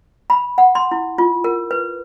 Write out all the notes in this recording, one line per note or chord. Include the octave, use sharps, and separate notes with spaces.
B5
F#5
C6
E4
F4
A#4
B4